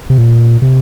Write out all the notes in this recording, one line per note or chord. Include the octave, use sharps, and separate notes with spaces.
C3
A#2
C3